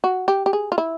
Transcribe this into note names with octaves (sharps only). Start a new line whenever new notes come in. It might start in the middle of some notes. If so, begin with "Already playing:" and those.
F#4
G4
G4
G#4
F4
E4